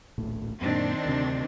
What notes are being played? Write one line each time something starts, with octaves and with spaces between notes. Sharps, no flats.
D1 A#1 A2
F#2 A#2 D#3 C4 D4
D2 C3